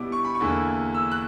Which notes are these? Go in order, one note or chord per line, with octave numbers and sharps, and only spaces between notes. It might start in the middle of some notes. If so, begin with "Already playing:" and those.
Already playing: B2 G3 B3 E4 D6
C#6
B5
C#6
E2 D3 A#3 E4
E6
F#6